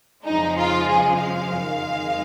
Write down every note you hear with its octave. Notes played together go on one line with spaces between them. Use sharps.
F2 C#3 F3 G#3 D#4
F4
G#4
F5
F2 D#3 G#3